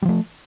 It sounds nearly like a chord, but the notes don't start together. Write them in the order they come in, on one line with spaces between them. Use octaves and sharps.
G3 F3 A3